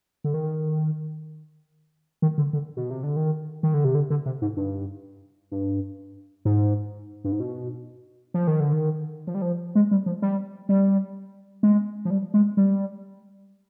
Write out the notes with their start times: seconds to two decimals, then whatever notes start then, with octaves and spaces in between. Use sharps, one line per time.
0.24 D3
0.34 D#3
2.22 D#3
2.38 D3
2.53 D3
2.77 B2
2.90 C3
3.03 D3
3.16 D#3
3.63 D#3
3.74 D3
3.85 C3
3.95 D3
4.10 D3
4.26 C3
4.42 G#2
4.57 G2
5.51 G2
6.45 G#2
7.24 G2
7.32 G#2
7.40 B2
8.34 F3
8.47 D#3
8.60 D3
8.73 D#3
9.27 F3
9.35 G3
9.42 F3
9.75 G#3
9.91 G3
10.06 F3
10.22 G3
10.69 G3
11.63 G#3
12.05 F3
12.10 G3
12.34 G#3
12.57 G3